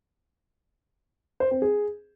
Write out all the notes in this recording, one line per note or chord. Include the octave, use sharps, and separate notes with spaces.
C5
C4
G#4